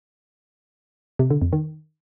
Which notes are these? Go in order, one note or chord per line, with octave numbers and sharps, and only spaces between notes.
C3
D3
F2
D#3